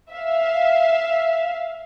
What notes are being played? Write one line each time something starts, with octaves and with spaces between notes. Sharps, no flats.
E5 F5